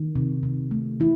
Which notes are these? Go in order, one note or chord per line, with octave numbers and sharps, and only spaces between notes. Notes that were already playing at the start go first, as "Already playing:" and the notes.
Already playing: D#3
C3
C3
A3
E3 E4